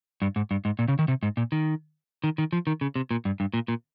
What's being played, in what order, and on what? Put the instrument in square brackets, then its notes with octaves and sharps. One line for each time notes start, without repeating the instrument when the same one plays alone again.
[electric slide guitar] G2
G#2
G2
G#2
A#2
C#3
D#3
C3
G#2
A#2
D#3
D#3
D#3
F3
D#3
C#3
C3
A#2
G2
G2
A#2
A#2